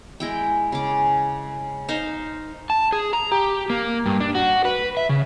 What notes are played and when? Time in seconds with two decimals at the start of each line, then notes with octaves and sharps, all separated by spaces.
0.20 G#3 E4 G5
0.72 C#3 D6
1.89 D#4 C5 F5
2.70 A5
2.93 G#4
3.13 A#5
3.32 G4
3.70 A#3
4.06 G2
4.20 D4
4.35 F#4
4.65 B4
4.97 E5
5.09 C#3